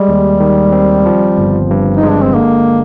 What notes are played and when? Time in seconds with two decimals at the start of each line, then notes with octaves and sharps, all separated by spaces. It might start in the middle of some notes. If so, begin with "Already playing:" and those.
Already playing: G3 G#3
0.08 D#2
0.40 D#3
0.72 C4
1.06 F3
1.38 G1
1.70 G2
1.97 D#4
2.03 G#3
2.09 D4
2.22 C4
2.35 D3 A#3